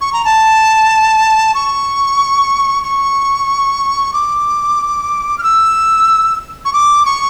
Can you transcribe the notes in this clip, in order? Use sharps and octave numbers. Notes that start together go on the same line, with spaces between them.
C#6
A#5
A5
C#6
C#6
D6
F6
E6
C#6
D6
C#6